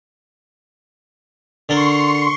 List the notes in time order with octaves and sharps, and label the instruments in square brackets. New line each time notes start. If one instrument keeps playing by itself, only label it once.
[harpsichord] D3 A4 A#4 [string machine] C6 C#6